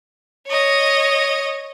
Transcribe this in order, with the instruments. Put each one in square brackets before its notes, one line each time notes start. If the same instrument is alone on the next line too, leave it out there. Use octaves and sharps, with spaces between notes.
[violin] C#5 D#5